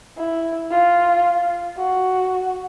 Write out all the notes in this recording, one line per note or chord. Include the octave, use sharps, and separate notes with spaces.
E4
F4
F#4